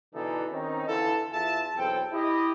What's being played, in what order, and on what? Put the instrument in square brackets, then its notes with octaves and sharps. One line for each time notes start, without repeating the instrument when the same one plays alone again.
[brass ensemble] B2 D3 E3 D4 D#4 A4
D#3 C4 C#4 D#4
D3 E3 E4 F4 A4
E2 F4 E5 A5
B1 E2 C4 A4 G5
E4 G4 D#5